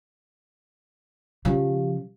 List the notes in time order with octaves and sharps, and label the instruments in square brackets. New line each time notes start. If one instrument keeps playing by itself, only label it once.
[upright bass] C#3 F3 [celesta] G4 F5